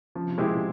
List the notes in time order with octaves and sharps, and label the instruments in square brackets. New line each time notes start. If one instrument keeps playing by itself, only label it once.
[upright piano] C#3 [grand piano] F3
[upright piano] C3
[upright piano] B2 [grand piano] G#3 C4 E4 G4
[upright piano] A#2